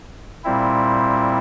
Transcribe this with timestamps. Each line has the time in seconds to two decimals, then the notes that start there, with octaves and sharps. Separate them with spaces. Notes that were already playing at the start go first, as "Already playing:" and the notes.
0.44 A#2 G3 C4 E4